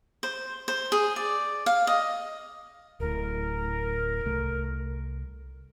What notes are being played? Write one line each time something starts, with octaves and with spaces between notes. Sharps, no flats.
C5
C5
G#4
D5
F5
D#5
D1 A2 A#4
C2 A3